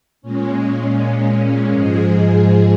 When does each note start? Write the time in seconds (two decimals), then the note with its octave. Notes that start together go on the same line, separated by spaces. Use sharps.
0.22 A#2 G#3 C#4
1.70 G#2 F3 G#3 G#4